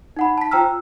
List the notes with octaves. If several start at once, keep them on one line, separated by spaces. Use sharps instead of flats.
D#4 F#5 B5
A5 B6
F4 C5 G5 A#5 E6 F6